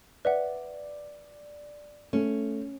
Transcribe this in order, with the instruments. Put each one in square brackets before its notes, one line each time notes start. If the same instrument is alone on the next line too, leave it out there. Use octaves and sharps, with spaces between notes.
[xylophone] B4 E5 F#5 [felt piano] D5
[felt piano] A3 [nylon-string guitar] C#4